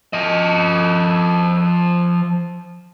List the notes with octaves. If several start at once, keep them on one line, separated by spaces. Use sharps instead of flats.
F3 D#5